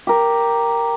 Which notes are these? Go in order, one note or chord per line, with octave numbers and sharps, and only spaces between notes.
G4 A#4